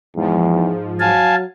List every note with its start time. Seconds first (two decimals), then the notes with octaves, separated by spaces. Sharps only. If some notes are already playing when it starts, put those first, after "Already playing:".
0.17 E2 G#2 F3
1.00 F#3 F5 G#5 A5